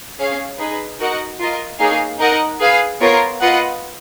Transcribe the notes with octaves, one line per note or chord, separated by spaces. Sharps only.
C#4 G#4 C#5 F5
D#4 G#4 B4
D#4 F#4 A#4 D#5 F#5
F4 A#4 D#5
A#3 D#4 G#4 C#5 F5
D#4 A#4 D#5 F#5
G#4 B4 F5
B3 F4 A#4 C#5
F4 B4 D#5 F#5